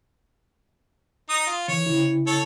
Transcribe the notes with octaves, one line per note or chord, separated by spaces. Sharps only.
D#4 D#6
F4
D#3 E3 C#5
C#3 E4
A4 C#5